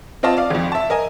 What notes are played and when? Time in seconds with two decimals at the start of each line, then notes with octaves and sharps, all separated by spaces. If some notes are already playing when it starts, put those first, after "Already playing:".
0.23 C4 F4 D#5 F5 A5
0.37 D5 F5
0.51 G#1 F2
0.72 E5 A5
0.90 A#4 D#5 G#5